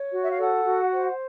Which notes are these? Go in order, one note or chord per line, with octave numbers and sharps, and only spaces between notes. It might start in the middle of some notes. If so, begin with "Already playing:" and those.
Already playing: C#5
F#4
E5
F5
A4 F#5
F#4
C5